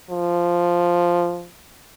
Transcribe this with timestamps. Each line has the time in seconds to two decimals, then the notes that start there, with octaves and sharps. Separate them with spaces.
0.10 F3